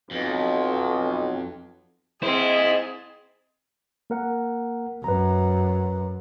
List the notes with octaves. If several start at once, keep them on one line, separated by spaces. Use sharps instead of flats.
B1 F2
C4 E4 G#4 C5 D#5
A#3 A#4 F#5
F#2 B4 A#5